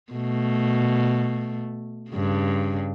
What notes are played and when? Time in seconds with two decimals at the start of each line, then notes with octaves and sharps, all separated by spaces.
0.13 B2 A3
2.11 G2 C#3